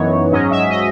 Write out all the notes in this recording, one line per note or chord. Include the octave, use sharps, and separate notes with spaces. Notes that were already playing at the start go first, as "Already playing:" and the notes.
Already playing: F#2 E3 B3 D#4 C#5
G#2 F#3 C#4 D#5
E5
D#5